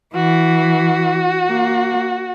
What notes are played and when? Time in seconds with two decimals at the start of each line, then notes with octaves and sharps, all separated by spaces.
0.15 E3 F#4
1.48 A#3